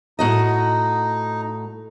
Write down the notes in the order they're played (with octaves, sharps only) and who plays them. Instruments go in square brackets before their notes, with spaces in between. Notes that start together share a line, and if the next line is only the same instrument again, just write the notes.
[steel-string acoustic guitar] A2 F#4 D#5 [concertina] D#4